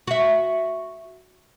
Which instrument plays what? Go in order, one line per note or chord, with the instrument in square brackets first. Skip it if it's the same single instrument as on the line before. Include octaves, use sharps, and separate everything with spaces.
[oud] F#4 E5